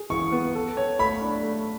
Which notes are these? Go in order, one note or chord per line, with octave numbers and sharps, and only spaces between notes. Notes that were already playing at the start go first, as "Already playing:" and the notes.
Already playing: G#4
E3 C#6
B3
A4
C#5
A3 B5
D4
A3